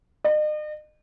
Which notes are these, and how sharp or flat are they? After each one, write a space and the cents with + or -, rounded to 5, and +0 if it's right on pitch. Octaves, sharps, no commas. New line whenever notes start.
D#5 -40